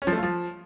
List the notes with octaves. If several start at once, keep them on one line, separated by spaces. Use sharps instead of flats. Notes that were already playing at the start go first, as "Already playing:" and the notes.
C#4
F3
A3
F4
F3